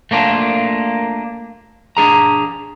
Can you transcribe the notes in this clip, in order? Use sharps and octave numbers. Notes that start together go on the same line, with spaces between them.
A3 A#3 D4 F4
D4 G#4 A#5